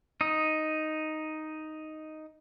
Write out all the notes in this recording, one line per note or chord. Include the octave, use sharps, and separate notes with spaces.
D#4 D#6